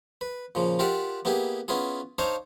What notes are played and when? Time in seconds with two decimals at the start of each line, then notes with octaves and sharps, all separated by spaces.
0.21 B4
0.55 A#2 C#3 F3
0.79 F4 G4 A#4 D5 E5 F#5
1.25 A#3 B3 E4 G4 G#4
1.68 B3 C#4 E4 F4 G#4
2.18 D4 D#4 C5 C#5 F5